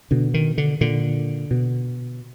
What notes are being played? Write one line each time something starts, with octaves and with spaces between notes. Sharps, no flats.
B2 D3
D#3
D3
A#2 D3
B2